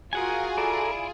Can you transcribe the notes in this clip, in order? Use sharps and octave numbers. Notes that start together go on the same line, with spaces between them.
F4 F#4 G#4 A#4 F#5 G#5
E4 A4 D5 A#5